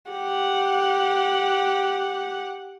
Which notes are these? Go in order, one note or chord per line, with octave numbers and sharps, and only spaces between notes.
G4 F#5